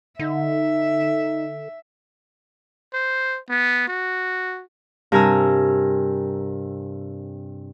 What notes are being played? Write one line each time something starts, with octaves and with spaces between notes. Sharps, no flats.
D3 D#4 E5
C5
B3
F#4
G2 C3 A#4 G#5 A#5 E6